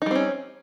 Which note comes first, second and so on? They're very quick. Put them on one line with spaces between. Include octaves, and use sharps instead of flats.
D#4 G3 C4 C#4